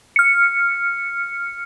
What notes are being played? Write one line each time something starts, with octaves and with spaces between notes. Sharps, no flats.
F6 C#7